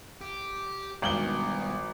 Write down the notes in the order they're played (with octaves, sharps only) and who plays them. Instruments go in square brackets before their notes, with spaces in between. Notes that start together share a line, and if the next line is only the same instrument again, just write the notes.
[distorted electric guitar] G4
[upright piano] G#1 F#7 G7 [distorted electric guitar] G2 B2